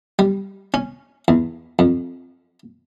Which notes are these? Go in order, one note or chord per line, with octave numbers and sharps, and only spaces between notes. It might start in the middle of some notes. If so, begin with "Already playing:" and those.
G3
C#4
E2
F2